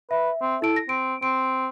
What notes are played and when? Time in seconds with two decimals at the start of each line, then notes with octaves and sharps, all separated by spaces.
0.11 B4 E5
0.42 C4
0.62 E4 A4 D7
0.76 A#6
0.89 C4 D7
1.22 C4 D7